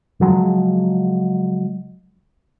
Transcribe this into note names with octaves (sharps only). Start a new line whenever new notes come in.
C#3 F3 F#3 G#3